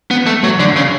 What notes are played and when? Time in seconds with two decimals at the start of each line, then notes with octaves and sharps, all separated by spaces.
0.11 B3
0.26 A3
0.44 F#3
0.60 D3
0.76 C#3